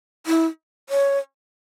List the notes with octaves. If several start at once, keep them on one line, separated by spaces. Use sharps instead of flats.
E4
C#5